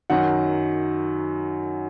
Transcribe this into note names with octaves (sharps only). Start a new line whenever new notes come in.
F#2 D#3 F#3 F#5